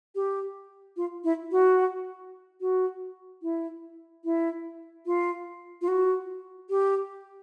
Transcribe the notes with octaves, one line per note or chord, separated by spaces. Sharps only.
G4
F4
E4
F#4
F#4
E4
E4
F4
F4
F#4
G4